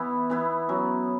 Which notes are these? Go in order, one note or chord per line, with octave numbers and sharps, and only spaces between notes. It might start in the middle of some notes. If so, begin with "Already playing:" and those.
Already playing: E3 B3 E4
E3 B3 E4
F#3 C#4 E4